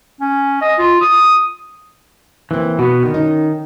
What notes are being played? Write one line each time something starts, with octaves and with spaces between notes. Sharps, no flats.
C#4
D#5
F4
D#6
E3 A#3 C4
B2 B3 F#4
D3 D#3
C#4 D#4